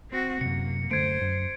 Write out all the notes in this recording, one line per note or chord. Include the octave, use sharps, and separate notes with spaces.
C4 F#4
F#2 C3 A#3 C#7
F#2 D3 A3 C5 G#6 D7
F#2